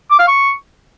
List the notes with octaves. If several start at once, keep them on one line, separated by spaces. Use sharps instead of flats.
D6
F5
C#6